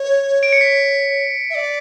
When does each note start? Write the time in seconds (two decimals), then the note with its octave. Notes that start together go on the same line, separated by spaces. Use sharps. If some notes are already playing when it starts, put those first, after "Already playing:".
Already playing: C#5
0.43 D7
0.52 C#7
0.61 B6
1.50 E5
1.55 D5